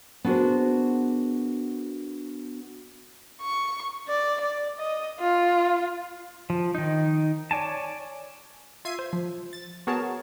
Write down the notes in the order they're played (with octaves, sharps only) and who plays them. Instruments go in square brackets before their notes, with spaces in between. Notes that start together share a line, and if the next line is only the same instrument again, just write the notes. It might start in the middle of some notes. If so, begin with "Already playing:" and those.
[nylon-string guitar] B3 D4 F#4 G#4 A#4 C5
[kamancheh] C#6
D5
D5
D#5
F4
[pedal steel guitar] F3
D#3 D#4
C#5 D5 G#5 A5
[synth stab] F4 E5 G#6 C7 D#7
C5
F3
A6
B3 F#4 G#4 A#4 C#5 A5